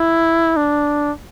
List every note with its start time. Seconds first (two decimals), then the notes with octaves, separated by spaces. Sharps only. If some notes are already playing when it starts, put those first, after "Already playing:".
Already playing: E4
0.57 D4